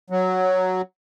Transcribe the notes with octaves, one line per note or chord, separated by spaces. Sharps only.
F#3